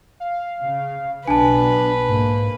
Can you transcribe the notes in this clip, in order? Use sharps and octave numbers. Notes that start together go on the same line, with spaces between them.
F5
C#3
B1 B2 B3 D4 B4 G#5 A5
G#2 A#3